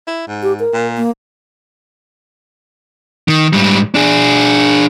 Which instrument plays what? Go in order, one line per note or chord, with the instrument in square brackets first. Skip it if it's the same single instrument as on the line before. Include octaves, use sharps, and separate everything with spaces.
[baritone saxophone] E4
G#2
[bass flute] G4
A#4
[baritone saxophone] A#2
[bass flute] A#3
[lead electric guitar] D#3
G#2 G3
D4 G#4